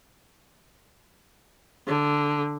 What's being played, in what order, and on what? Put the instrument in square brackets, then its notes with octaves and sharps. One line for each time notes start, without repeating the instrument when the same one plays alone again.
[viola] D3